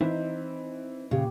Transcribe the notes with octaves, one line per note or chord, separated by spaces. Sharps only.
E3 C4 D#4 C5 E5
A#2 C#3 G4